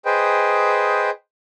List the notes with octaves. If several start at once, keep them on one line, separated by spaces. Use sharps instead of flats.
G#4 B4 C5 D#5 G5